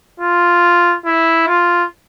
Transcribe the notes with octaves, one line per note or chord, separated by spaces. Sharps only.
F4
E4
F4